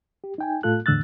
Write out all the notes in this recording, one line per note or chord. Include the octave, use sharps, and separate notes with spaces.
G4
D#4 G5 G#5
A2 A3 F4 A4 F#6
E2 A2 D3 E6 F#6 A6